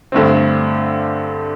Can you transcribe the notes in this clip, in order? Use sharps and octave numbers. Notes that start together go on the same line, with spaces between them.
G2 D3 A3 C4